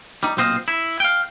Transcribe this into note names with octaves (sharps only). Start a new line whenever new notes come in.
G3 D#4
B1 A#2 C4 C5 D#5 F5
E4
F5 G5